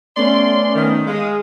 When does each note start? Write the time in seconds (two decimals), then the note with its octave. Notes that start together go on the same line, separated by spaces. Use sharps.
0.17 A3 B3 C#4 D5 C6
0.75 D#3
1.07 G#3 F5 D#6